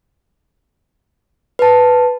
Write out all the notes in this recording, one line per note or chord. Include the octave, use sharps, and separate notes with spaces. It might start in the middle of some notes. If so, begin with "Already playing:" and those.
B4 A5